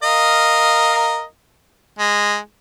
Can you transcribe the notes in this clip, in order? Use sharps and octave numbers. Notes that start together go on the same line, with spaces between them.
A#4 D#5 F5
G#3